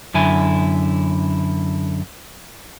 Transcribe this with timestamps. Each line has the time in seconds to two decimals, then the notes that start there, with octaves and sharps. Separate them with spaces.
0.14 F#2 D3 E4 G#5